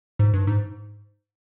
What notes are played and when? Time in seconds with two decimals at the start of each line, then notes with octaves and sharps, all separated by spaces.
0.19 G#2
0.34 G2
0.47 G#2